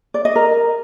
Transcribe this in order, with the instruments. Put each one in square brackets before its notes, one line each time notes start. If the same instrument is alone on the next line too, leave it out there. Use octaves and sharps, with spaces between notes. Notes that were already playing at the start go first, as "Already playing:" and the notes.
[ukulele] D5
D#5
A#4